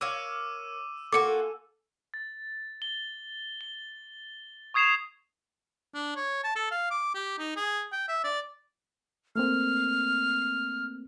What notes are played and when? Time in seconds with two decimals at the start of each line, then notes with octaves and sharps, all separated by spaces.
0.01 A#4 C#5 F5 D6 E6 D#7
1.13 A#3 F4 F#4 A4 G#5 D6 C#7
2.14 A6
2.82 G7
3.61 G7
4.74 C#6 D#6 G#6 C7 E7 F7
5.94 D4
6.16 C#5
6.44 A5
6.56 A4
6.71 F5
6.91 D6
7.14 G4
7.38 D#4
7.56 G#4
7.92 G5
8.08 E5
8.24 D5
9.36 A3 A#3 C4 F6